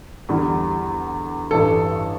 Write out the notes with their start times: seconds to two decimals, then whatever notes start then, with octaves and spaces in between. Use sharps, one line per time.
0.29 E2 D3 G3
1.51 A1 G2 E3 G3 A4